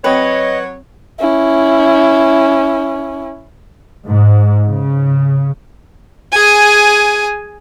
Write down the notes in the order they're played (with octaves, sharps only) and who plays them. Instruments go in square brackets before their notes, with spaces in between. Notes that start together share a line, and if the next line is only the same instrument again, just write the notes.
[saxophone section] F#3 C#5 [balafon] C4 G5 [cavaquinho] B4 [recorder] D#5
[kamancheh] C#4 E4
[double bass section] G#2
C#3
[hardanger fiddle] G#4 G#5